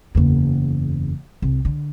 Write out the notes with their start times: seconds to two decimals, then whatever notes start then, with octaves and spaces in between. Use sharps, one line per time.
0.15 F#1 E2
1.42 C2
1.65 D3